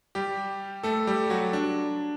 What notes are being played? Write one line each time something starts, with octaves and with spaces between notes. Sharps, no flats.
G3 G4
A3 A4
G3 G4
F#3 F#4
D4